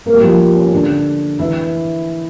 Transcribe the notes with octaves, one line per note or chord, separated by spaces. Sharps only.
A#3 A#4
G3 G4
F3 F4
C#4
D3 D4
E3 E4